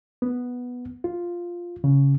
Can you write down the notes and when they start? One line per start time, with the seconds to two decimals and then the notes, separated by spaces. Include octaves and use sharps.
0.22 B3
1.04 F4
1.84 C#3